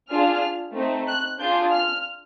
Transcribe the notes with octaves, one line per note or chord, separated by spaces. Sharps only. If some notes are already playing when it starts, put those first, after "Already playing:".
D4 F4 G#4 F6
A3 C4 D#4
F#6
D4 F4 G#4 G6
F6